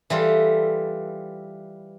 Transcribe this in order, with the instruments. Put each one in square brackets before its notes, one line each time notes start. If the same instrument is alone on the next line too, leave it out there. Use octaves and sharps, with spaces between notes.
[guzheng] E3 G3 F4 A4